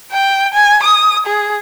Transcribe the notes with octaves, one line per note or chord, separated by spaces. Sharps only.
G5
G#5
D#6
G#4